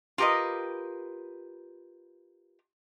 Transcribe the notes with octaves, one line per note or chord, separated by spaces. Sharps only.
F4 G4 A#4 B4 D#5